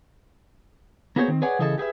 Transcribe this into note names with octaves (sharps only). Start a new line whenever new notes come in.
A#3 B3 F#4 G#4 C5 C#5
D#3 C4
G#4 B4 C#5 D5 F#5 G#5
C#3 E3 G#4 A4 D#5 A5
G4 G#4 B4 E5